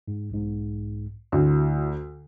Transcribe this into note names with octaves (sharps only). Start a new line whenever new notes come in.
G#2
B1 G#2
D2 E4 F#4